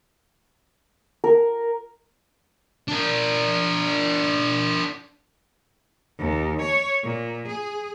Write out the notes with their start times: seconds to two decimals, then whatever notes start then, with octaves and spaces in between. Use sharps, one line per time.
1.24 A#4
2.89 D4 A#4
6.19 D#2
6.61 C#5
7.03 A#2
7.47 G#4